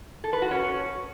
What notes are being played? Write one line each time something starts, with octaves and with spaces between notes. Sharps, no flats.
A4
B4
F#4
C#4